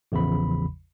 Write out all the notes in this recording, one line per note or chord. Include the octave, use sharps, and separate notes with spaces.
A1 E2 C#3 F3 B5